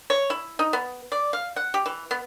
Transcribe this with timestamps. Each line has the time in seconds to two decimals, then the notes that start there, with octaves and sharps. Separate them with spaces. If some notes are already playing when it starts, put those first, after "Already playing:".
0.10 C#5
0.30 E4
0.59 D#4
0.73 B3
1.12 D5
1.33 F5
1.56 F#5
1.74 G4
1.86 E3
2.11 B3